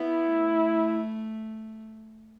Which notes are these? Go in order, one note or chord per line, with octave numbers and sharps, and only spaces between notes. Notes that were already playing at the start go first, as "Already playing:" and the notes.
Already playing: B3 E4
A3